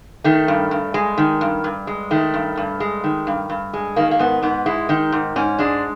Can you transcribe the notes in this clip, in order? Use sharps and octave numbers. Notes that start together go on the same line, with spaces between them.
D#3 A3
G2
G2
G#3
D#3
G2
G2
G#3
D#3 A3
G2
G2
G#3
D#3
G2
G2
G#3
D#3 A#3
A#3
G#2 B3
G#2 B3
G#3 E4
D#3 D#4
G#2
G#2 C#4
G#3 D4